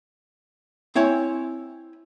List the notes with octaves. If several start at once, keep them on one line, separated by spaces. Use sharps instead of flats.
C4 E4 C#5 G#5